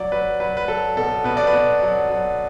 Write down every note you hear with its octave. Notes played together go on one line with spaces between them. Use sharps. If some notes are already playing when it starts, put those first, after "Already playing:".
Already playing: F#3 D5
F#3 B4
F#3 B4
B4
F#3 A4
B2 A4
B2 B4
D5
B4
B2
F#3
F#3